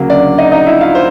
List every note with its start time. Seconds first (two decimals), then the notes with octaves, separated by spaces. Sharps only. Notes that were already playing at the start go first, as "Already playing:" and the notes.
Already playing: D2 C#3 F#3 A#3
0.10 D4 D5
0.38 D#4 D#5
0.52 D#4 D#5
0.66 E4 E5
0.81 F4 F5
0.95 C5